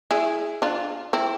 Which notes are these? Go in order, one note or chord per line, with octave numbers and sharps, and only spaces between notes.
E4 G#4
D4 F4
C4 E4